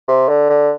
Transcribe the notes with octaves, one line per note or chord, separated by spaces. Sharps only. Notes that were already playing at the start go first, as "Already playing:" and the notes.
C3
D3
D3